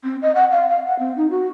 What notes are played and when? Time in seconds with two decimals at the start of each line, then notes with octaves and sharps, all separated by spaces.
0.04 C4
0.22 D#5
0.35 F#5
0.51 F5
0.69 F5
0.86 F#5
0.99 C4
1.17 D#4
1.31 F#4